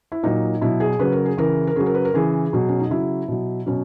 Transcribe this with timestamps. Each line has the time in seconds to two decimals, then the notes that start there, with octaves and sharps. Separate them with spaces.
0.12 E4
0.23 A#2 F#3 D#4
0.61 B2 F#3 E4
0.80 G#4
0.99 C#3 F#3 B4
1.12 A#4
1.26 G#4
1.38 C#3 E3 A#4
1.67 A#4
1.76 C#3 F#3 G#4
1.86 A#4
1.94 B4
2.05 A#4
2.14 C#3 E3 G#4
2.53 B2 F#3
2.69 C#4
2.80 D#4
2.90 C#3 F#3 E4
3.28 B2 F#3
3.66 B2 F#3 C#4